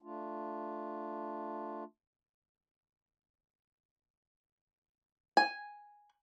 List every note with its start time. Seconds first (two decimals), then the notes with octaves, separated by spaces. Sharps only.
0.02 A3 D4 F4
5.37 G#5